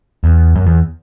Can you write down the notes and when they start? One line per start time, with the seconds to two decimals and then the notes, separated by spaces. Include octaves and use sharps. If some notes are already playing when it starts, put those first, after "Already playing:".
0.24 E2
0.56 F#2
0.67 E2